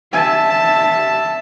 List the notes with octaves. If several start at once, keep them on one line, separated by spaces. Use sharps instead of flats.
E5 A5